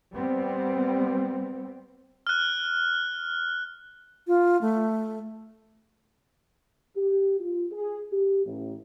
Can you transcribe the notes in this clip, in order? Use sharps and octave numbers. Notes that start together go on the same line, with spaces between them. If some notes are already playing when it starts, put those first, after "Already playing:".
G3 B3 C4
F6 F#6
F4
A3
G4
F4
G#4
G4
A1